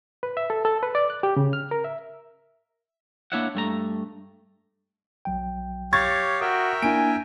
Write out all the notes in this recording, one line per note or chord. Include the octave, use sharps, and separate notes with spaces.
B4
E5
A4
A4
B4
D5
F#6
G4
C#3
F6
A#4
E5
A#3 D4 E4 C#5 E5 F#5
G2 A3 A#5
B1 F#3 G5
G4 C#5 F5 C#6 G#6 A6
F#4 A#4 E5 G5 D#6
A#3 D4 E4 G#5 D7